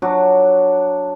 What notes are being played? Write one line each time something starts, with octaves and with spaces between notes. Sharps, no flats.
F#3 D4 F#4